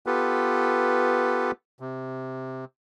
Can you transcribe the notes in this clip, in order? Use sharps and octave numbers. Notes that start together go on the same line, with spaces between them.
B3 F4 G4 A4 B4
C3